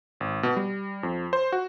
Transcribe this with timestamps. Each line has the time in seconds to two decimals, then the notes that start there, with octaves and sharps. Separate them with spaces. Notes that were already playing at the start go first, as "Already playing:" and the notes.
0.20 G#1
0.43 B2
0.56 G3
1.03 F2
1.33 C5
1.52 F#4